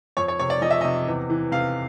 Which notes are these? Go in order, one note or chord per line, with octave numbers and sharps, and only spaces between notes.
F2 C#5
C#5
C3 C#5
D5
F3 D#5
E5
C3 D#5
E2
E3
C3 F5